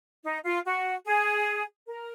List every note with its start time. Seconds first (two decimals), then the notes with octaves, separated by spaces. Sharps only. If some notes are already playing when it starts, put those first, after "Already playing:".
0.24 D#4
0.44 F4
0.65 F#4
1.05 G#4
1.87 A#4